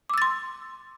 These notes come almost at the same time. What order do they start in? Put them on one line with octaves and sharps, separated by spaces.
D6 E6 A6 C6